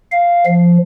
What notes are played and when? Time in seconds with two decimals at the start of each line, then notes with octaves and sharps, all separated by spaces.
0.11 F5
0.46 F3